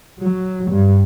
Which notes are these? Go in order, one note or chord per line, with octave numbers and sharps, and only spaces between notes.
F#3
G2